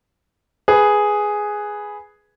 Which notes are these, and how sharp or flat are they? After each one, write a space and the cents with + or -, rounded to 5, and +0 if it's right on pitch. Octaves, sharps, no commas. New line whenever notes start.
G#4 +0 B4 +0